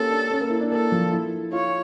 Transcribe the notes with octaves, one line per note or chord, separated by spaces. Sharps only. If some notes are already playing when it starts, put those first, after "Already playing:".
Already playing: A#3 C#4 F4 G4 A4
D4
C#4
A#3
E4
D4
A#3 A4
F3
E4
F4 C#5